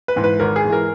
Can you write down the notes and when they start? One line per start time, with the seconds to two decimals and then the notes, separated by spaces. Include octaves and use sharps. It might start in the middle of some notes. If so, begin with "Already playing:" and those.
0.08 B4
0.16 G#2 E3
0.24 B4
0.40 G#1 A#4
0.56 G#4
0.65 G#2 E3
0.72 A#4